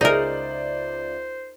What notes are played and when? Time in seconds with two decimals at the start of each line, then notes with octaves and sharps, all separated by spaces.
0.01 C#2 D#4 G#4 A#4 C5 D5 E5